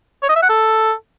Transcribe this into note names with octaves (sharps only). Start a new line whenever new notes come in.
C#5
D#5
E5
F#5
A4